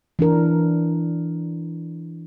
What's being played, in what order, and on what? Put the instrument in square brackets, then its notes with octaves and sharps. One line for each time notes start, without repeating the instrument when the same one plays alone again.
[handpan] E3 D4 A#4